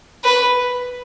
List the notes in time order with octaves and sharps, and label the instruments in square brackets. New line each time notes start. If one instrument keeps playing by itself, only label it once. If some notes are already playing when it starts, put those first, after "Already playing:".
[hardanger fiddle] B4